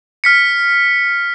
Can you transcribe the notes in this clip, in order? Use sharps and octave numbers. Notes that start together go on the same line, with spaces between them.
F6 B6 C#7